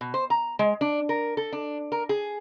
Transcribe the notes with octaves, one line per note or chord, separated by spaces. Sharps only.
B2
C5
A#5
G#3
D4
A#4
A4
D4
A#4
G#4